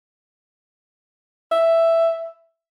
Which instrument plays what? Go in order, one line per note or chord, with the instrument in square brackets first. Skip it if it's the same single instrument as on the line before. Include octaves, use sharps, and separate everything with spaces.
[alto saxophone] E5